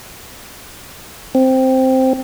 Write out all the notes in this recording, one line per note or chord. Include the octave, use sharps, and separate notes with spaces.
C4